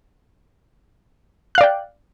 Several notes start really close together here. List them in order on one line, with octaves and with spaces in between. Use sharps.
F#6 F5 D5 G5